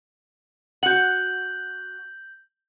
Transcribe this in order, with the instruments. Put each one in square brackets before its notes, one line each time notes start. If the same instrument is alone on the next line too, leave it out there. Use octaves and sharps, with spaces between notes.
[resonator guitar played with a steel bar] F#4 F#5 [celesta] G6 F#7